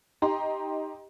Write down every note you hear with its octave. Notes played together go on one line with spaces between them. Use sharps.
D#4 G4 A#5 C6